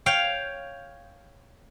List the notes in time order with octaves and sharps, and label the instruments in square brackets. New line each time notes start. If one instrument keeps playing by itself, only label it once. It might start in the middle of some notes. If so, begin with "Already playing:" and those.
[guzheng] C#5 F5 G5